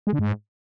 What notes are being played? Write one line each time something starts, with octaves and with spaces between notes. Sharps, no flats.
G#3
D3
G#2